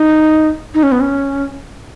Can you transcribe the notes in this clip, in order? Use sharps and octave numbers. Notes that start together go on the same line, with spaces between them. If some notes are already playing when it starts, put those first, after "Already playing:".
Already playing: D#4
D#4
C#4
B3
C#4